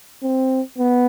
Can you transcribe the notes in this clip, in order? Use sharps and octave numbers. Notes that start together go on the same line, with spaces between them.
C4
B3